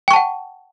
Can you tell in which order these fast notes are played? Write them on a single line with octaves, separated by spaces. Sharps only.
G5 C#6 A5 F#5